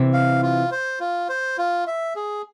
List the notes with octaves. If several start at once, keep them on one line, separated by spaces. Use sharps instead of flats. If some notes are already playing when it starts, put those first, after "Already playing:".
Already playing: C3 E3
F5
F4
C5
F4
C5
F4
E5
G#4